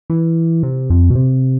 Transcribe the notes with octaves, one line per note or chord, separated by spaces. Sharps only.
E3
C3
F2
B2
C3